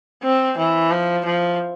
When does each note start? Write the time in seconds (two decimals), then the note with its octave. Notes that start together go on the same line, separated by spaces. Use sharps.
0.23 C4
0.58 E3
0.91 F3
1.26 F3